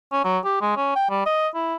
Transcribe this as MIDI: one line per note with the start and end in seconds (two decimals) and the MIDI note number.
0.12 0.23 61
0.24 0.38 54
0.45 0.60 67
0.61 0.76 56
0.77 0.92 61
0.96 1.09 79
1.10 1.24 55
1.26 1.48 75
1.54 1.76 64